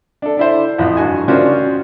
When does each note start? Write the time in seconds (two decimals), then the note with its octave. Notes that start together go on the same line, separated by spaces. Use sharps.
0.22 D4 A4
0.37 D4 E4 C5
0.78 A1 F2
0.97 G2 F#4 G#5
1.28 D#3 C#4 D4 F4 F#4 C5